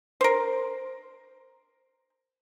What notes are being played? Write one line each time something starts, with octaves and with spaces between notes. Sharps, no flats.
A#4 C5